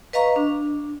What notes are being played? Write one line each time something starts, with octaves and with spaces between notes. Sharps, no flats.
B4 D#5 F5 A#5 C#6
D4